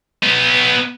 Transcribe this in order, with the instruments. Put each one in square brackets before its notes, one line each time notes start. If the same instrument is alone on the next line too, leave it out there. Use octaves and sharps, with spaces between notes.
[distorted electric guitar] B3 D#4